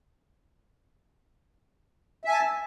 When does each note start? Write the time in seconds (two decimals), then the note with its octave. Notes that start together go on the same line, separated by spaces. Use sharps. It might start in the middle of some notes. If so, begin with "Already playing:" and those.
2.25 E5
2.28 G#5
2.32 A5